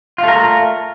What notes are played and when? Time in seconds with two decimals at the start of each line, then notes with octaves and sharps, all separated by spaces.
0.18 F4
0.23 A3
0.28 A#4